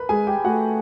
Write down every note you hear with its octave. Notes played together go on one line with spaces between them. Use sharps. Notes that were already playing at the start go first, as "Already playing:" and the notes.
Already playing: A#4 B4 B5
G#3 G#4 G#5
G4 G5
A3 F#4 F#5